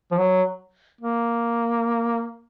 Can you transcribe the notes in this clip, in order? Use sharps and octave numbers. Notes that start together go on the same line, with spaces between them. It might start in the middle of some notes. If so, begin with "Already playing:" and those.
F3
F#3
A#3